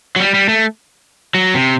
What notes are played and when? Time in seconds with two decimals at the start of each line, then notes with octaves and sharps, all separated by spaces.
0.16 F#3
0.20 G3
0.34 G3
0.49 A3
1.35 F#3
1.55 C3